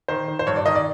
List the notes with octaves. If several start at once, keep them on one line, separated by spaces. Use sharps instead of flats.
D#3 C5
D#3
C5
G2 C#5
D5
D#3 D#5
D5